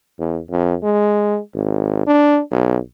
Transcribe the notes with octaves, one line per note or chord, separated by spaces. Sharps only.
E2
F2
G#3
G#1
D4
B1